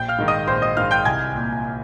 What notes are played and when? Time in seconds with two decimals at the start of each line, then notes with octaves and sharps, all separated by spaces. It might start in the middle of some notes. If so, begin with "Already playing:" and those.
Already playing: A#1 G5 G6
0.08 F5 F6
0.18 G#2 D#3
0.28 D#5 D#6
0.47 A#1 C5 C6
0.62 D#5 D#6
0.77 G#2 D#3 F5 F6
0.91 G5 G6
1.05 C2 G#5 G#6
1.35 A#2